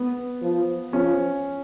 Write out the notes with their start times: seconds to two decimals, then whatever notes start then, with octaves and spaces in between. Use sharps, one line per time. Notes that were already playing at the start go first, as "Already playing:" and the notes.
Already playing: B3
0.42 F3
0.93 F3 C#4